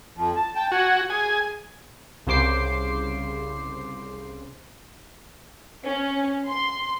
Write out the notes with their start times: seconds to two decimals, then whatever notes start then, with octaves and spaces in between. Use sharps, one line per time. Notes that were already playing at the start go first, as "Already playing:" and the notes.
0.17 F2 F3
0.36 A5
0.55 G5 A5
0.72 F#4 F#5 G#5
1.10 G#4 G#5
2.27 C2 C#3 C5 D6 C7
5.84 C#4
6.47 C6